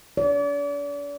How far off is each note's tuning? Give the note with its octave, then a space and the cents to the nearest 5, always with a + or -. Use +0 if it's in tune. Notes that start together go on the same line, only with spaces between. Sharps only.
D5 -40